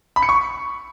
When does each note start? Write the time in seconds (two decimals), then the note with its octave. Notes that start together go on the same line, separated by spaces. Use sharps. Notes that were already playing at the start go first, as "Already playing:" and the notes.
0.16 B5
0.22 C#7
0.29 C#6